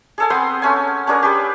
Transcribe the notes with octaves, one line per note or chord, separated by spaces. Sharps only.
G#4 A4 G#5
B3 C4 C6 D#6
A3 C#4 G#5
C#4 D4 G#4 A#4
G4 G#4 B4